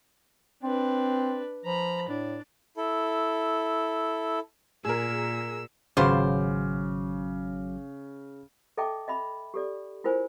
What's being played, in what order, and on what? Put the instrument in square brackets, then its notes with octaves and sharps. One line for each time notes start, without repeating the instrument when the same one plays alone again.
[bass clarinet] C4 [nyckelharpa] D4 B4
[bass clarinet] F3 [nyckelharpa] A#5 B5
[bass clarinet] A2 [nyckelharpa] D4
[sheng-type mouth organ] E4 A4
[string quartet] A#2 [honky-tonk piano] G#4 A#4 [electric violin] E6
[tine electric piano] G#1 F#3 D6 [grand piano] C#3 [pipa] B3 F4 C5
[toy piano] A4 D#5 E5 G5 A5 D6
D#5 E5 B5
G4 A4 D5
E4 F4 A#4 C5 G#5